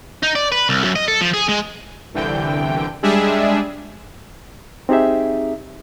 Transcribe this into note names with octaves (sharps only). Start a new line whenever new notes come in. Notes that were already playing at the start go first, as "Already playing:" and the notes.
D#4
D5
B4
C2
F#2
D#5
A4
F3
G#4
G#3
G1 C2 D3 E3 G5
G3 G#3 D4 G#4 E5
C4 D#4 G4 G#4 E5